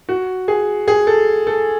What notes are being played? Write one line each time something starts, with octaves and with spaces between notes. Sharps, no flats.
F#4
G#4
G#4
A4
A4